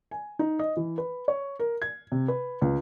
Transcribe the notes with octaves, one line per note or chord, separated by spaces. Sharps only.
G#5
D#4
D#5
E3
B4
C#5
A#4
G#6
C3
B4
C#2